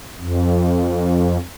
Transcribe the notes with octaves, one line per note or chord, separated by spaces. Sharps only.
F2